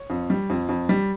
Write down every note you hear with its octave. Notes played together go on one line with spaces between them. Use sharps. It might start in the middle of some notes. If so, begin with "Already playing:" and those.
Already playing: C#5
F2
G3
F2
F2
G3